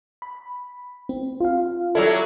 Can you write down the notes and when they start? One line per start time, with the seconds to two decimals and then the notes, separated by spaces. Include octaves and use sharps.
0.22 B5
1.09 C4
1.40 F4 F5
1.95 F#3 G3 E4 A4